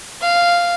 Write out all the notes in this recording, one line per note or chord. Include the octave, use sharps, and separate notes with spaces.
F5